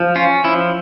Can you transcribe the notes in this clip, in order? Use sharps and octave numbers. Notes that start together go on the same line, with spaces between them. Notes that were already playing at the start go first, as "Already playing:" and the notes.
Already playing: F3
C#4 F4
F3 E4